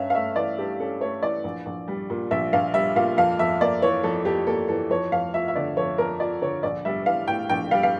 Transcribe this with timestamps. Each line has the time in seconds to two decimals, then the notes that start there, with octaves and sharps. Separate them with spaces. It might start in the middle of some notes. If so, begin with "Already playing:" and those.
Already playing: G2 C#4 E5 F5
0.10 F5
0.15 A3 E5
0.36 E3 D5
0.58 G2 G4
0.80 C#4 A4
1.01 A3 C#5
1.23 E3 D5
1.44 A#1
1.66 A#1
1.88 G3
2.10 A#2
2.31 A#1 E5
2.53 A#1 F5
2.74 G3 E5
2.96 A#2 F5
3.17 F2 F5
3.39 F2 E5
3.61 A#3 D5
3.82 E3 C#5
4.03 F2 A4
4.25 F2 G4
4.47 A#3 A4
4.68 E3 A4
4.90 F2 C#5
5.12 F2 F5
5.34 F3 E5
5.48 E5
5.56 D3 D5
5.77 F2 C#5
5.98 F2 A#4
6.20 F3 D5
6.42 D3 C#5
6.63 A#1 D5
6.85 G3 E5
7.06 E3 F5
7.28 A2 G5
7.49 A#1 G5
7.71 G3 F5
7.83 F5